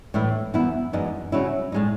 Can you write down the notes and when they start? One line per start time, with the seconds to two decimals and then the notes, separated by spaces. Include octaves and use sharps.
0.14 A2 E3 A3 E4
0.54 F#2 E3 B3 E4
0.93 F#2 E3 G#3 D#4
1.32 C#3 F#3 C#4 E4
1.72 A2 G#3 D#4